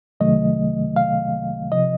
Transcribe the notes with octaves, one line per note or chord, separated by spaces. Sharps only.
C2 C3 D#3 F#3 A3 D#5
F5
C3 F3 D#5